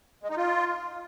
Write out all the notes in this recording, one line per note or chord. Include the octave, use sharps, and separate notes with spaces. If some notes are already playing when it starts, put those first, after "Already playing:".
G#3
D#4
F4